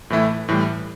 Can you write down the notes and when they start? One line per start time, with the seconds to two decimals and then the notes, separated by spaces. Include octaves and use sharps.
0.10 A2 E3 A3 E4
0.48 A2 E3 G3